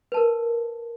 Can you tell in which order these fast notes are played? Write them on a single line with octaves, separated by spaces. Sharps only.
B4 A5 A#4